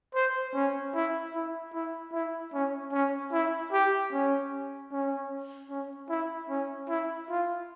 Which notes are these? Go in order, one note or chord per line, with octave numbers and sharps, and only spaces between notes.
C5
C#4
E4
E4
E4
E4
C#4
C#4
E4
G4
C#4
C#4
C#4
E4
C#4
E4
F4